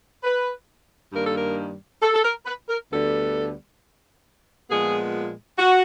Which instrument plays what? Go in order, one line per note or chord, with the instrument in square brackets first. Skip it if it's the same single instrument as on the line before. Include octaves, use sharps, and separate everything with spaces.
[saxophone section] B4
G2 D#3 G3 A#3 A#4
A4
A#4
A4
A4
A#4
B4
A#4
D2 D3 G3 B3 A4
A#2 F3 G#3 B3 G#4
F#4